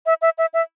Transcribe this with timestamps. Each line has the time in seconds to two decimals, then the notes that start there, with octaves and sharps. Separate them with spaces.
0.06 E5
0.22 E5
0.38 E5
0.54 E5